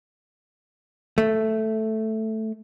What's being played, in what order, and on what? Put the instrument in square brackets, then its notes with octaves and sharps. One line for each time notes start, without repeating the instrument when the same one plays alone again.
[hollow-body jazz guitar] A3